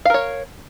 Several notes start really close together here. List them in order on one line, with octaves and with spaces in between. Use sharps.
F5 A#4 C#5